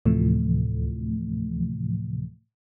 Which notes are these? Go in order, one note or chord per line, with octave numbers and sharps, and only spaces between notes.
D2 A2 C3 E3 F3 A3